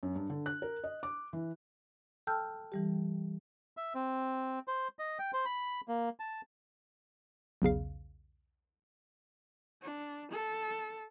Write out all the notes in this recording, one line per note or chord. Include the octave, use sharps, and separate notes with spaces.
F#2
G2
D3
F#6
A#4
D#5
D6
E3
A4 G5 A5 E6 F6 G6
E3 G3 G4
E5
C4
C5
D#5
G5
C5
B5
A#3
A5
B1 E2 C#3 F5
D4
A4